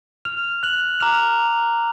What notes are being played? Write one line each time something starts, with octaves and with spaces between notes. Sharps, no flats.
F6 F7
F#6 F#7
A#5 D6 F6 F7